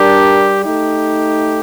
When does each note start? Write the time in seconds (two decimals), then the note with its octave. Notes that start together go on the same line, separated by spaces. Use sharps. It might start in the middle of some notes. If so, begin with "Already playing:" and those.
Already playing: G3 D4 G4 A#4
0.64 A3 D#4 G4